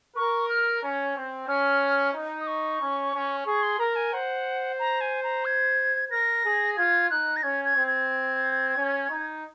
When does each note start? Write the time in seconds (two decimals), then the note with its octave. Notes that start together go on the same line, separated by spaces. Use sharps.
0.16 A#4 C#6
0.49 F6
0.83 C#4
1.15 C4
1.48 C#4 F6
2.14 D#4
2.41 D#6
2.47 C#6
2.81 C#4
3.13 C#4
3.46 G#4 C#6
3.63 C6
3.79 A#4 A#5
3.96 G#5
4.12 C5 F#5
4.79 A#5
5.01 G#5
5.23 A#5
5.45 G#6
6.10 A#4 A#6
6.45 G#4
6.77 F4 G#6
7.10 D#4 F#6
7.36 A#6
7.43 C#4 G#6
7.65 G#6
7.76 C4
7.88 G#6
8.76 C#4
9.09 D#4